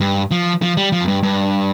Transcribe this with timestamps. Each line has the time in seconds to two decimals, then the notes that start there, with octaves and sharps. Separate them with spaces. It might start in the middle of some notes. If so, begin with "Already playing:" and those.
0.01 G2
0.31 F3
0.62 F3
0.77 G3
0.92 F3
1.01 F2
1.08 G2
1.23 G2